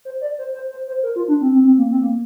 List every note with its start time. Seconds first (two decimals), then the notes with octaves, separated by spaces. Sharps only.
0.05 C5
0.21 D5
0.38 C5
0.54 C5
0.71 C5
0.87 C5
1.03 A#4
1.16 F4
1.28 D4
1.41 C4
1.53 C4
1.65 C4
1.78 A#3
1.91 C4
2.02 A#3